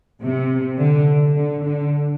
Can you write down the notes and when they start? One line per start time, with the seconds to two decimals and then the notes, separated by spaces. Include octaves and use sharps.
0.22 C3
0.79 D3
1.35 D3
1.64 D3